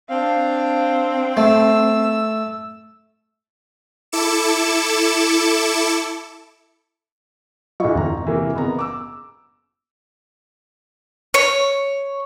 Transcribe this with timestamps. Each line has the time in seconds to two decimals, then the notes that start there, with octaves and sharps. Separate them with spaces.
0.10 C4 D4 F5
1.37 A3 E6
4.12 E4 A4 D6 C#7 E7
7.80 B1 F#3 E4 F4 D#5 C#6
7.95 G1 E2 A#5
8.25 C3 E3 A#3
8.53 F#1 B3 A#5
8.79 D6 E6
11.34 C#5